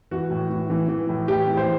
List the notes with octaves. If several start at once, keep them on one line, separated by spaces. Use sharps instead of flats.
E3 F#4
A2
E3
E3
E3
A2
E3 G4
E3
C5